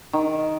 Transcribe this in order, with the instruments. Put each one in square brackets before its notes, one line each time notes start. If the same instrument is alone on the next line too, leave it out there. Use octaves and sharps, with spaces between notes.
[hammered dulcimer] D#3